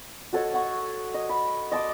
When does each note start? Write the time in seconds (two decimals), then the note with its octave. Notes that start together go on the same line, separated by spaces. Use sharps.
0.33 F#4 A4 C#5 D#5
0.54 F#5 C#6
1.14 D#5
1.29 B5
1.72 D#5 A5 C6 D6